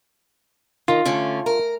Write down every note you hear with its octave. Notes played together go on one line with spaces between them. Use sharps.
D#3 F4
D3 A3 C#4
A#4